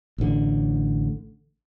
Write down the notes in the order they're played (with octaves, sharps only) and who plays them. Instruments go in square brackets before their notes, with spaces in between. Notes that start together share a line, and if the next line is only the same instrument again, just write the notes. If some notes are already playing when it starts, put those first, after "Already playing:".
[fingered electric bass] A1 D3